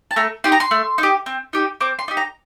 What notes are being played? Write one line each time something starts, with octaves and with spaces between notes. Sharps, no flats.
A5
A3 A#5
D#4 G4 C6
A#5
C6
A3
D#4
G4
C4
D#4 G4
C4 D6
C6
D#4 G4
A#5